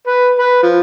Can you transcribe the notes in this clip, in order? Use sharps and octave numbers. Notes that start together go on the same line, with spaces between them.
B4
B4
F3